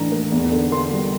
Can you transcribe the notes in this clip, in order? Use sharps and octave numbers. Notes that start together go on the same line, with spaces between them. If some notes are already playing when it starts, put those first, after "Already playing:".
Already playing: A2 E3 D4 A#5
A#3
E2
D3
A#3 C6
G3